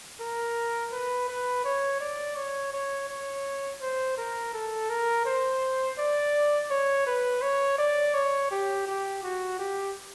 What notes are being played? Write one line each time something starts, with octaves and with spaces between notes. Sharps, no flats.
A#4
B4
B4
C#5
D5
C#5
C#5
C#5
C5
A#4
A4
A#4
C5
D5
C#5
B4
C#5
D5
C#5
G4
G4
F#4
G4